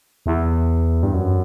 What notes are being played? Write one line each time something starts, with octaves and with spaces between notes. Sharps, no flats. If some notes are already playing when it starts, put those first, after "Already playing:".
E2
G2
F#2